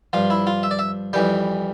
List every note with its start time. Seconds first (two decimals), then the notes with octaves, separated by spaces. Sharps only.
0.13 G2 F3 F4
0.30 E4
0.47 F4
0.63 E5
0.71 D5
0.79 E5
1.13 F2 E3 G3 G5